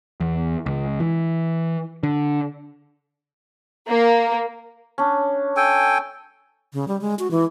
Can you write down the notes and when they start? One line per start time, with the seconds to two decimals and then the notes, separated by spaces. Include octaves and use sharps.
0.20 E2
0.66 C#2
1.00 E3
2.03 D3
3.88 A#3
4.98 C#4 D4
5.57 A4 G5 G#5
6.73 C#3
6.88 G3
7.01 G#3
7.19 F#4
7.31 E3